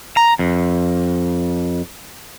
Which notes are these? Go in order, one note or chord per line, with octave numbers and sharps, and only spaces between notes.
A#5
F2